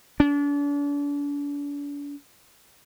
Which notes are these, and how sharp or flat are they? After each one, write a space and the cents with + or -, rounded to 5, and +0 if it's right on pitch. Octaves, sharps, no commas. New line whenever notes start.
D4 -40